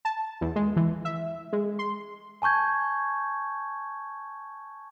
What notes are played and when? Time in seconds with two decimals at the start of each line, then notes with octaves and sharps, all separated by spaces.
0.05 A5
0.41 E2
0.56 G#3
0.76 E3
1.05 E5
1.53 G#3
1.79 C6
2.42 G#5 A5 C#6 G6 G#6